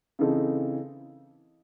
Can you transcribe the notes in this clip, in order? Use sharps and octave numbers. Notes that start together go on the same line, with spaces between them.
C#3 E3 C4 D#4 A4